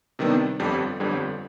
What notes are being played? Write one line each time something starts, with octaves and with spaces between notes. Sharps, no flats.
C3 D#3 G3 B3 D4
G1 F2 D3 G3
G1 F2 D3 G3